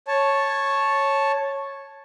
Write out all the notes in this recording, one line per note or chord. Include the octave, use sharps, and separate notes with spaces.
C#5 A5